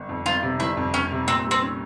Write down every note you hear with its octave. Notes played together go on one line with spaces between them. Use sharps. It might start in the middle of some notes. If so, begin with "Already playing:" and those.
Already playing: G1
F2
G1 F4
C3
G1 E4
F2
G1 C#4
C3
A#2 C4
G3
C4
C#4